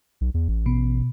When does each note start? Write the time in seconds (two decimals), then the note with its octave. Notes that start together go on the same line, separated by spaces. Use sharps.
0.21 B1
0.34 E2
0.48 A1
0.66 B2